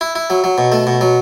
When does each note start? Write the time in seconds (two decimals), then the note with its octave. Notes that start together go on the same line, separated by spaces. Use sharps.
0.01 E4
0.15 E4
0.30 F#3
0.44 F#3
0.58 B2
0.72 A3
0.87 B2
1.01 F#3